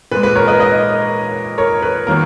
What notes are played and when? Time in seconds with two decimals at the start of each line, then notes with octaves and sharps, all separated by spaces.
0.11 A#2 B4
0.15 G#3
0.23 B4
0.35 A#4 C#5
0.47 B4 D#5
0.60 B4 D#5
1.58 A#4 C#5
1.82 B4
2.07 D#3 F#3 A#3 A#4